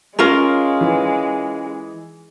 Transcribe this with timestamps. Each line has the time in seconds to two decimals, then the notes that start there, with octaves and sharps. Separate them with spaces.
0.19 G#3 C#4 F4 A#4 C#6
0.81 E3